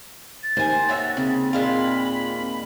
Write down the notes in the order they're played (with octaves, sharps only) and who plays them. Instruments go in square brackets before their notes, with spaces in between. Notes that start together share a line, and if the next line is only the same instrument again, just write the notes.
[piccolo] A6
[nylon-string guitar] D#2 [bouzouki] C5 G#5
[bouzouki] F#4 C#5 E5
[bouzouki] C#3 [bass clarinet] C4
[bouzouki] A#2 G#3 F4 [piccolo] B5